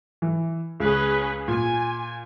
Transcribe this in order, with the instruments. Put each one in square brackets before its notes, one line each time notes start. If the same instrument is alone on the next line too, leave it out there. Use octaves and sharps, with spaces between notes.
[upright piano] E3
[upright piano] C#2 [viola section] C#4 G#4 B4
[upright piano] A#2 [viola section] G#5